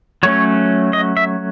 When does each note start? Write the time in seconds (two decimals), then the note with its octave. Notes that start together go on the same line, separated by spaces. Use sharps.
0.23 F#3 A3 C#4 C#5
0.93 D#5
1.17 E5